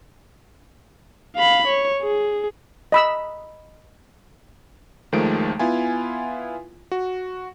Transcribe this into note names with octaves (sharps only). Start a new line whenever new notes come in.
F5 B5
C#5
G#4
D#5 B5 E6
D#2 D#3 F3 G#3 A3 D7
B3 E4 F4 G#5
F#4